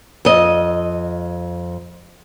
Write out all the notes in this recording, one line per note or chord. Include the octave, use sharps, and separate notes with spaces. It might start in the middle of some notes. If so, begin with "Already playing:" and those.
F2 D#5